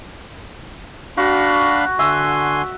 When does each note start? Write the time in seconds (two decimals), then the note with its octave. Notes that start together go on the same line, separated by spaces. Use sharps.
1.17 D4 F#4 F5 B5
1.99 D3 E5 G#5 C6